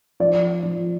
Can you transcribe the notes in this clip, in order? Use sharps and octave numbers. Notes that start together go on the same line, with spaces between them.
F3 D5
F3